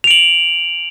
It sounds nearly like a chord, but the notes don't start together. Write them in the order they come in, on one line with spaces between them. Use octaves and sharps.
F7 D7 F#7